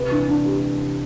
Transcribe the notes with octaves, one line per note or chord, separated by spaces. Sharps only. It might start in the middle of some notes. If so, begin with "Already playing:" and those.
Already playing: C3 B4
E3 D4
D4
G4